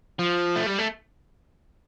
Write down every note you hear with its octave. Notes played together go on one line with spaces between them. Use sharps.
F3
A3
G3
A3